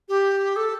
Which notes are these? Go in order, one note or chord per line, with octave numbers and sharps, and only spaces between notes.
G4
A4